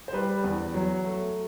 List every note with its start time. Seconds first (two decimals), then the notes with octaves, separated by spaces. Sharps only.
0.08 C5
0.13 G3 B4
0.44 E2
0.74 F#3
1.04 A3